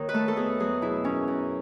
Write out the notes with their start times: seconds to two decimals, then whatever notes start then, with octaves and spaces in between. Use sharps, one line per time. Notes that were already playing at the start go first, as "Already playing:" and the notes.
Already playing: D#2 D#3 C#5
0.09 B4
0.14 A3 A4
0.28 A4
0.37 E2 G#4
0.60 F#3 G#4
0.82 B2 E4
1.04 F#2 C#4
1.28 F#2